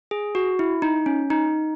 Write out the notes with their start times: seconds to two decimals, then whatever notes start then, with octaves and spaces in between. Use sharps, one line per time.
0.11 G#4
0.35 F#4
0.59 E4
0.82 D#4
1.06 C#4
1.30 D#4